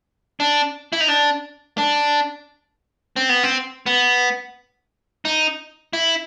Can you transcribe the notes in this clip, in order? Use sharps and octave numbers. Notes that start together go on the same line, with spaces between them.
D4
E4
D#4
D4
D4
C4
B3
C4
B3
D#4
E4